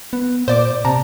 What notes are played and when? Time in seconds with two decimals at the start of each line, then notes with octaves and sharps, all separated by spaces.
0.13 B3
0.48 A#2 C5 D5 D6
0.85 C3 A5 A#5